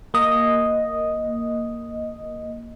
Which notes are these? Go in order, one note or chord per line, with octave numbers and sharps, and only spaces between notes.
A#3 D#5